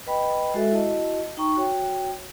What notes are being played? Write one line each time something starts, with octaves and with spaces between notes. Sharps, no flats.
B4 D#5 G5 B5
G#3 F#4 A4 E5
E4 F#4 D#5 A5
D#4 G5 A#5 C#6
F#4 C#5 G5